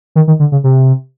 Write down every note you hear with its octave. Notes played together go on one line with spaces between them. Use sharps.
D#3
D#3
D3
C#3
C3